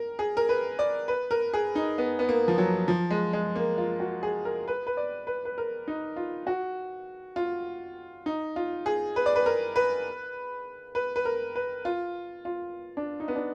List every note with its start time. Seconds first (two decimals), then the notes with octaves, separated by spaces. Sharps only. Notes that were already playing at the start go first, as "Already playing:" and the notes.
Already playing: A#4
0.19 G#4
0.37 A#4
0.49 B4
0.79 D5
1.08 B4
1.31 A#4
1.53 G#4
1.75 D#4
1.98 B3
2.19 B3
2.29 A#3
2.48 F3
2.58 F#3
2.88 F3
3.10 G#3
3.33 G#3
3.56 A#3
3.78 F4
4.00 F#4
4.23 G#4
4.45 A#4
4.68 B4
4.87 B4
4.97 D5
5.27 B4
5.45 B4
5.58 A#4
5.88 D#4
6.16 F4
6.47 F#4
7.36 F4
8.26 D#4
8.56 F4
8.86 G#4
9.16 B4
9.26 D5
9.36 B4
9.46 A#4
9.76 B4
10.95 B4
11.16 B4
11.25 A#4
11.56 B4
11.85 F4
12.45 F4
12.97 D4
13.20 D#4
13.28 B3
13.36 D4